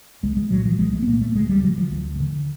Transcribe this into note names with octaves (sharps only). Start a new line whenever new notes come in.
C2 G#3
G#3
A#2 F#3
F3
C2 G#3
A3
B3
A#2 A#3
A3
D2 G#3
G3
D3 F#3
F3
D2
D3